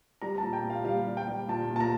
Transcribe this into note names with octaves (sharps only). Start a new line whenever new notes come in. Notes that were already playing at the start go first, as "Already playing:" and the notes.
G3 A#5
A#2 A5
G5
A#2
F5
G3 F5
G3
G5
G3
A#2 A5
A#2
A5
A#5